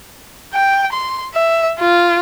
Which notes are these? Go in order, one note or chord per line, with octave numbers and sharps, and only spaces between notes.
G5
C6
E5
F4